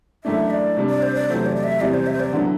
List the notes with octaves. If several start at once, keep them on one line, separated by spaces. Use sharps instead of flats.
F#2 E3 A3 D4 E5
D5
C3 G3 D4
D5
C5
D5
E2 C3 F#3 A3 C5
D5
D5
E5
E2 C3 G3 C4 D5
C5
E5
C5
D5
D3 F#3 B3 E4